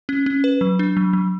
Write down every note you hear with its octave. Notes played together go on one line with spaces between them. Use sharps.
C#4
C#4
B4
F#3
D4
F#3
F#3